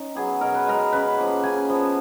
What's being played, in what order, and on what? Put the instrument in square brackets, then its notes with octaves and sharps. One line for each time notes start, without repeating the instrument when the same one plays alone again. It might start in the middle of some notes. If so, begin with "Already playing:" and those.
Already playing: [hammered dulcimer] C#4 D#4
F#3 B3 G#4
B2 A#4
B4
G#3 B3 A#4
C#3 B4
F3 A#3
C#3 G#5
F3 B3